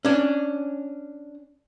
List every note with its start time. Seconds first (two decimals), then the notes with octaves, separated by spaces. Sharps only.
0.05 C#4 D4